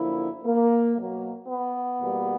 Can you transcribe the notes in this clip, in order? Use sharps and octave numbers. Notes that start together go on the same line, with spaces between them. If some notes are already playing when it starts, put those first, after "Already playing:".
Already playing: F#2 D3 F3 A#3 E4
A#3
B2 F#3 A#3
B3
E2 B2 G3 A#3